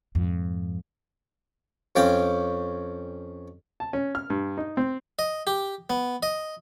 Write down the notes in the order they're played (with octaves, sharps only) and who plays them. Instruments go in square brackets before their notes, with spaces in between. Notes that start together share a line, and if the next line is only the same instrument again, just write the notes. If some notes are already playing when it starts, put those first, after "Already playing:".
[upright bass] F2 G#2
[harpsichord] F2 C#4 F5 G5 D6
[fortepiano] A5
C#4
F6
G2
D#4
C4
[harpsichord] D#5
G4
B3
D#5